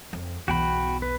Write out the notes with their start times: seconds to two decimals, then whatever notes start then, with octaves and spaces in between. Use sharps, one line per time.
0.13 F2
0.48 B1 E2 F#4 G5 B5
1.02 B4